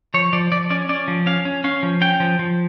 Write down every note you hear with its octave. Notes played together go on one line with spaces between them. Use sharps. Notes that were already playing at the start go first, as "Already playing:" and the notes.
F3 C#5
F3 D5
F3 D5
C#4 D5
C#4 D5
F3
C#4 F5
C#4
C#4 F5
F3
C#4 G5
F3
F3